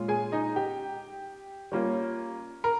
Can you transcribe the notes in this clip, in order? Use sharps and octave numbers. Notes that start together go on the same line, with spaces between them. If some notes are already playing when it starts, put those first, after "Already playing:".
Already playing: A#2 G#3 C#4 F4
G#4 G#5
D#4 D#5
G4 G5
G3 A#3 C#4 F4
A#4